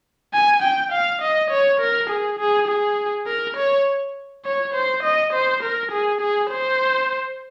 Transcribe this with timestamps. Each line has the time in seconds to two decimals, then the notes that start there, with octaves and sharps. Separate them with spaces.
0.34 G#5
0.62 G5
0.92 F5
1.22 D#5
1.50 C#5
1.80 A#4
2.09 G#4
2.39 G#4
2.68 G#4
3.27 A#4
3.56 C#5
4.45 C#5
4.74 C5
5.03 D#5
5.33 C5
5.63 A#4
5.92 G#4
6.21 G#4
6.51 C5